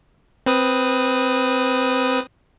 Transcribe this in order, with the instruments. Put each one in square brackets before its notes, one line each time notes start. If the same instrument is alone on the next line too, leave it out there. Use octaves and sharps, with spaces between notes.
[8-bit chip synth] C4 B4 D#6